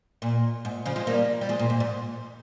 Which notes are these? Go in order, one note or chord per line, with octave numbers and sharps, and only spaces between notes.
A#2
G#2
C#3 F3
F3 G#3
G3 A#3
G3
F3 G#3
A#2
G#2
G#2